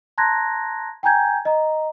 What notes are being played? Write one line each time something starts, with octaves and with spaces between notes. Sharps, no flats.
A5 A#5 C6 F#6 G#6 A#6
G5 G#5 A#5 G6 G#6
D#5 A#5